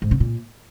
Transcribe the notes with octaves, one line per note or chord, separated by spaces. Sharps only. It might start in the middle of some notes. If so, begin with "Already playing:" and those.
G#2
C#3
A#2